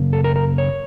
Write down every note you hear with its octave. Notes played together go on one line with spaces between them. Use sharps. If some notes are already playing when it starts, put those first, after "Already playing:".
Already playing: F#2 C#3 A#3
A4
A#4
A#4
C#5